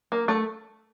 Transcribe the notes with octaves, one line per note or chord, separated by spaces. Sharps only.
A#3
A3